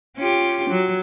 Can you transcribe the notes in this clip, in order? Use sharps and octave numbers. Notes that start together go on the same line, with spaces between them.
C#4 F4 G4
F#3